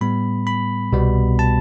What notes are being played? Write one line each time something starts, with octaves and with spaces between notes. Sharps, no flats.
A2 G3 B3 B5
B5
C2 B2 G3 B3
A5